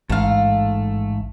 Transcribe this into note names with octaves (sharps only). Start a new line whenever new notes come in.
A1 G#2 A3 F5